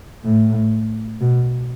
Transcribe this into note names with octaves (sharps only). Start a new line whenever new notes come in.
A2
B2